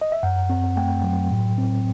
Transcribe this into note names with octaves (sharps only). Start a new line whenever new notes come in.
D#5
E5
F#2 F#5
C4
A3 G5
F#3
A2
C4